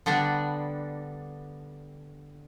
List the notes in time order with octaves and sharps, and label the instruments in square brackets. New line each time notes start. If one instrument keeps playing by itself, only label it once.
[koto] D3 G3 B3 D4